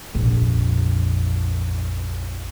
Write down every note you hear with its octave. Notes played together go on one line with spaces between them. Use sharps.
A#1 F2